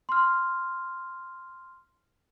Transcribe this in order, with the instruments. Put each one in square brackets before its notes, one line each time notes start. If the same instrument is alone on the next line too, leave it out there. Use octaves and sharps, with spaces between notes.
[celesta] C6 F6